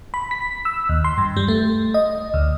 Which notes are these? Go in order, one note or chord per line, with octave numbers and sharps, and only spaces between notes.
B5
B6
E6
D#2
C6
G2
G3
A3
D#5
D2